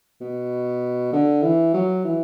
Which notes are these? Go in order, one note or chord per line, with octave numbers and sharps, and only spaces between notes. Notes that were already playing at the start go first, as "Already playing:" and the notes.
B2
D3
E3
F#3
E3